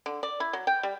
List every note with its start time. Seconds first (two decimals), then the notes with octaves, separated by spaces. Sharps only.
0.06 D3
0.23 D5
0.40 E4
0.53 F#3
0.67 G5
0.83 G3